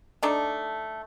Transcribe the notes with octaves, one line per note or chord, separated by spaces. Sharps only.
A3 D4 D#4